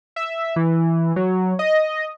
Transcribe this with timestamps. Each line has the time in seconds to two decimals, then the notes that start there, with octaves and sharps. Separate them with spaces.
0.16 E5
0.56 E3
1.16 F#3
1.59 D#5